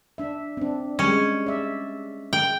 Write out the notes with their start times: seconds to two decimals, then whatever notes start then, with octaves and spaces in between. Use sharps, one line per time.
0.18 D4 E5
0.57 C4 D4
0.99 G3 G#3 C#4
1.46 D5 E5
2.33 G5